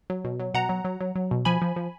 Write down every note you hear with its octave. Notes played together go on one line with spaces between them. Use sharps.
F#3
B2
F#3
B2 F#5 A#5
F#3
F#3
F#3
F#3
B2
F3 G#5 B5
F3
F3